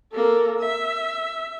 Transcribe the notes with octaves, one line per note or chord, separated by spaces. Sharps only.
A#3 A4
E5